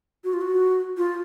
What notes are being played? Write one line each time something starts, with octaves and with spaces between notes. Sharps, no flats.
F#4
F4
F#4
F4